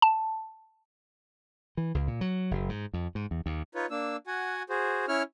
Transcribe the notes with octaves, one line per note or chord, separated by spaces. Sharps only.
A5
E3
C#2
A#2
F#3
F#1
G#2
F2
G#2
E2
D#2
D#4 F4 B4 C#5
A#3 D4 E6
F#4 F#5 G#5
F#4 G#4 C5
C#4 E4 C#5 F6